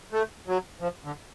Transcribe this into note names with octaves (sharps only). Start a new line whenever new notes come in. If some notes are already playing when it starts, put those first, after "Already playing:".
A3
F#3
F3
D3